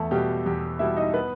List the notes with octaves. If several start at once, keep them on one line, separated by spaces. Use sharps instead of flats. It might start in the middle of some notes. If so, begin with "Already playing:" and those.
Already playing: E2 A3 A4
B2 G3 G4
E2 G4
B2 G3 E4 E5
D#4 D#5
B3 B4